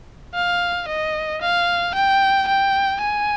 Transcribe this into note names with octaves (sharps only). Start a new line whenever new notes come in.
F5
D#5
F5
G5
G5
G#5